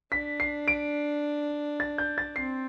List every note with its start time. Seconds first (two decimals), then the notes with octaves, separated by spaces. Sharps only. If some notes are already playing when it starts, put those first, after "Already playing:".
0.12 D4 B6
0.40 C7
0.68 D7
1.80 A6
1.98 G6
2.18 A6
2.36 C4 C7